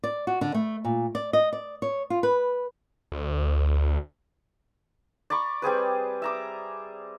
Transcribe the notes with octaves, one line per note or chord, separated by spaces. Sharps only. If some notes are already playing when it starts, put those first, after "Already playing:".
D5
F#4
D3
A3
A#2
D5
D#5
D5
C#5
F4
B4
D2
D5 A#5 B5 C#6
G3 C4 G#4 B4
E5 A#5 D6